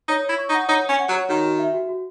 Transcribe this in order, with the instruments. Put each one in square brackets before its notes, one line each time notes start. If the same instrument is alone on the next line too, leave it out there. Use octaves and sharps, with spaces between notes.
[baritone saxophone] D#4 [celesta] C#5
[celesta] C#5
[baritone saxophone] E4
[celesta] C#6
[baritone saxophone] D#4
[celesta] F#5
[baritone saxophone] D#4 [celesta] C#5
[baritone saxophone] C#4 [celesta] C#5
[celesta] F#5
[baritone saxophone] F#3
[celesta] C#5
[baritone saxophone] D#3 [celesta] F#4
[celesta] F#4
E5
F#4
F#4